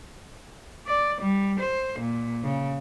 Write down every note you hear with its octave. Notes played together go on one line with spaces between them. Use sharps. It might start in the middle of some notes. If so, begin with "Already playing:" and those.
D5
G3
C5
A#2
C#3